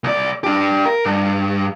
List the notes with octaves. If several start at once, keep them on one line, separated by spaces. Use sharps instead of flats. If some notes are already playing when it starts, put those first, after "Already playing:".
C2 D5
D4 G4
A#4
G2